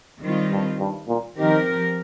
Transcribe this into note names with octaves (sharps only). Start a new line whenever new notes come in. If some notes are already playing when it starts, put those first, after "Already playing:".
D#3 G3 C4 F4
G2
G2
A#2
D#3 F3 C4 G4 A#4